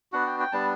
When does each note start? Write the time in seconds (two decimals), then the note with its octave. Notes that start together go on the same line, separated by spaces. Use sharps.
0.12 B3 D4 F#4 F#5
0.27 G5
0.40 G5
0.52 G3 B3 D4 A5